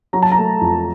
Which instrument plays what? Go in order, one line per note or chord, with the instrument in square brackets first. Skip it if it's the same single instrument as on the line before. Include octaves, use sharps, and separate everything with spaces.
[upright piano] F#3 A#5
A5
A#5
A3
F2